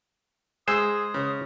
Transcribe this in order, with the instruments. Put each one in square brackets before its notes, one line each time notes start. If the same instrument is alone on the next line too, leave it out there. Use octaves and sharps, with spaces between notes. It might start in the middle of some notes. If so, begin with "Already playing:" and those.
[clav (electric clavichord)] G#3 C5 [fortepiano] G#4 E6 [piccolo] D#6
[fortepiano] C#3